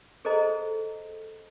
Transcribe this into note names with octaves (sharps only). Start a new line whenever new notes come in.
G#4 A4 C5 D#5 A#5